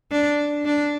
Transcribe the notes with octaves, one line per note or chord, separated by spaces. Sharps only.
D4
D4